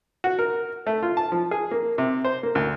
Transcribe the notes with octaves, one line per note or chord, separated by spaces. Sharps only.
F#4
A#4
A3
F4
A5
F3
G#4
A#3
C3
C5
A#3
D2